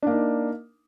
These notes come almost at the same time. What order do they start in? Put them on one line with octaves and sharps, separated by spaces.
D4 A#3 D#4